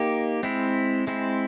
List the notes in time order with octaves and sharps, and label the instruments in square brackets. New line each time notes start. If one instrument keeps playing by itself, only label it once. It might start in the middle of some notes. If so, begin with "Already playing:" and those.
Already playing: [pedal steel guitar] A#3 D#4 G4
G#3 C4 E4
G#3 C4 E4